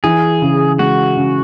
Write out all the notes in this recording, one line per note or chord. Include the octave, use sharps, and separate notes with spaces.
E3 G#4
C#3
G#3 F#4
C#3